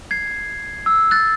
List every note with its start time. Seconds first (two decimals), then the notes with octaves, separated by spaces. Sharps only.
0.11 G#6 C7
0.86 E6
1.11 F#6 A6